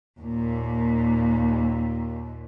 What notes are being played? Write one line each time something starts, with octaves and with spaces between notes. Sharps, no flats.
D#2 A#2